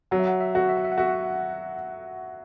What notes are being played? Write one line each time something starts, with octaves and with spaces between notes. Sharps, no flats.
F#3 F#5
E5
F#5
E5
F#4
E5
F#5
E5
F#5
F#4 E5
F#5